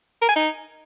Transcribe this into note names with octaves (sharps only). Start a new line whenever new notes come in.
A#4
G#5
D#4